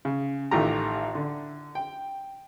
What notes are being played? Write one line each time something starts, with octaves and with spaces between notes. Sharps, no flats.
C#3
A1 D#3 A3 F4 G4 A#5
D3
G5